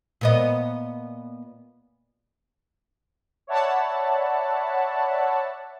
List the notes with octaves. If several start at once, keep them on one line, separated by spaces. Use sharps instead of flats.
A#2 B3 D#5
C#5 D5 E5 F#5 A5 B5